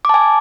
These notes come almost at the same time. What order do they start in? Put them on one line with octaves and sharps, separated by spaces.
D6 A5 G#5